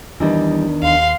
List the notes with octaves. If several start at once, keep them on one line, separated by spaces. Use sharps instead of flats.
E2 D#3 E3 G3 D4
D#2 F5 C6